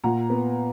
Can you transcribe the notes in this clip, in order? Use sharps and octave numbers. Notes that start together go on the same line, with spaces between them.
A#2 F#5 A#5
B3